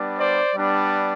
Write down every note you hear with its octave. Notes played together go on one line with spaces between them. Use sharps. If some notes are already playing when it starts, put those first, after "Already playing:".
Already playing: G3 B3 D4
C5 D5
G3 B3 D4